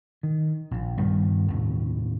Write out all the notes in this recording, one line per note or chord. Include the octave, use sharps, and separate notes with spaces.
D#3
A#1
G2 D#3 G3
D#2 A2 C3